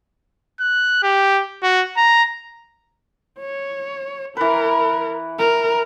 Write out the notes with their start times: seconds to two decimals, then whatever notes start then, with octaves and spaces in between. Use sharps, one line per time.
0.60 F#6
1.03 G4
1.63 F#4
1.97 A#5
3.40 C#5
4.37 E3 A#4 B4
5.38 A#4